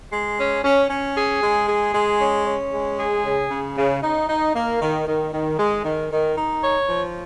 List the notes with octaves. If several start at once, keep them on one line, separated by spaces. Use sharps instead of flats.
G#3
C#4
C#4
C#4
G#4
G#3
G#4
G#3
C#4
C#4
G#3
G#4
C#3
C#3
C#3
D#4
D#4
A#3
D#3
D#3
D#3
G#3
D#3
D#3
D#4
C#5
F3